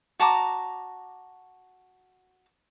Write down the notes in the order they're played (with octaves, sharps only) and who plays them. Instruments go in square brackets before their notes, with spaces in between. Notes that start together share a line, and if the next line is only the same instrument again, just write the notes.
[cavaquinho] F#4 A5 A#5 D6